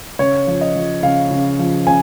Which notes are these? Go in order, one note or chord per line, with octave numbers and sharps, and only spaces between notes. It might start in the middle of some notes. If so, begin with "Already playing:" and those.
C#3 C#5
F3
D#5
F3
C#3 F5
C#3
F3
C#3 G#5